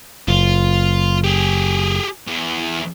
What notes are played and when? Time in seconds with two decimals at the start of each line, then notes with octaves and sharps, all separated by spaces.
0.28 F#1 F4
1.24 G4 G#4
2.27 E2